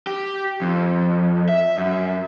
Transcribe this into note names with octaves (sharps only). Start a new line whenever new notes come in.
G4
F2
E5
F#2